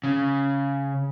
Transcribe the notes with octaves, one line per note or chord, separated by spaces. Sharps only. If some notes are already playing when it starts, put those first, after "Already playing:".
C#3